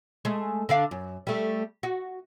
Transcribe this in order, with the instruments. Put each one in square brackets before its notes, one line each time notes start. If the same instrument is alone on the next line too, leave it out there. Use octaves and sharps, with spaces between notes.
[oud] G#3 A3
D3 D4 F5
F#2
G3 A3
F#4